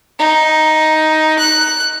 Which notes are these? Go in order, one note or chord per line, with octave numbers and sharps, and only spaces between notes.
D#4
F#6